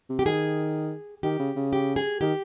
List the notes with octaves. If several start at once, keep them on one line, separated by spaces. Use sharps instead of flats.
C3
G4
D#3 G#4
D#3 G4
C#3
C#3
G4
G#4
D#3 G4